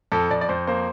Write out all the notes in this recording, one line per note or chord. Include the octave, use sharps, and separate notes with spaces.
F2 A4
F2 D5
D5
F2 C5
A#3 C5